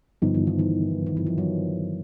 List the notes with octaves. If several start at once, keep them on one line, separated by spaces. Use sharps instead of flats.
G2 D3 F3 G3 B3 D#4
E3
D#3
E3
D#3
E3
F3
F#3